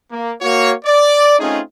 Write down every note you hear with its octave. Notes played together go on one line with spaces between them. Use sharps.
A#3
A#3 F#4 C#5
D5
A3 C4 C#4 D#4 F4 G#4